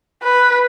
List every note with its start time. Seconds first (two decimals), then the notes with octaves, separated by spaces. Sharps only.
0.23 B4